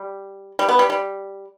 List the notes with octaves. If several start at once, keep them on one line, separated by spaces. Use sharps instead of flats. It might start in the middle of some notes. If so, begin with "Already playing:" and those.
Already playing: G3
G3
B3
G3
G3